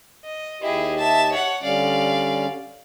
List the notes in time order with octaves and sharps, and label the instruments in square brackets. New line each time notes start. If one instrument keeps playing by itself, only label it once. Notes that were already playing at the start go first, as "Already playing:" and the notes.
[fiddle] D#5
[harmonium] D#2 G4 D#5 [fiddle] E4 G#4
[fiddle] E5 A5
C#5 F#5
[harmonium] D3 G3 C#4 [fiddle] D5 F5